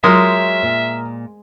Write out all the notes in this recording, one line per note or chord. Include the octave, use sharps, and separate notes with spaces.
F#3 G#3 F4 A#4 C5 E5 D#6
A#2